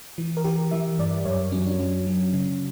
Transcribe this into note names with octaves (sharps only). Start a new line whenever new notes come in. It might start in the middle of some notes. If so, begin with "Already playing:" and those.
E3
A#4
E3 G4
E3 E5
G2 D5
F#2 C#5
F#3 C#4
D4
F#3
F#3
C#3